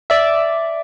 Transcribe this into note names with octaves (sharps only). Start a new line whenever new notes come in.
D5 E5